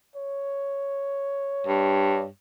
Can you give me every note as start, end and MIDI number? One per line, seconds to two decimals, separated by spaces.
0.16 2.26 73
1.67 2.27 43